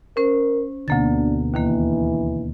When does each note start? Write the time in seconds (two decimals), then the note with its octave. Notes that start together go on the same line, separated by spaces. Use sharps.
0.17 C#4 A#4 C5
0.88 D2 B2 D3 A#3 D4 A6
1.54 D#2 D#3 E3 A#3